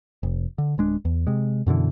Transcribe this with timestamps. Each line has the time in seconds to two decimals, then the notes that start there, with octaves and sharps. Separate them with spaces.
0.23 F1
0.58 D3
0.78 D1 G#3 D4
1.05 E2
1.27 C3 G#3
1.66 F#2 B2 D3 E3